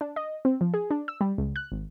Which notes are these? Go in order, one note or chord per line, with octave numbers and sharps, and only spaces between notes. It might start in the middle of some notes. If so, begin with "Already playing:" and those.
D4
D#5
C4
F3
G#4
D4
E6
G3
C#2
F#6
G#1